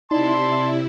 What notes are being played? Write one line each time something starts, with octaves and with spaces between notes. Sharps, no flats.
C3 D#4 E4 D5 A5 C6